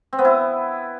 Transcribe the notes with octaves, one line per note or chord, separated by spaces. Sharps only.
C4
B3
E4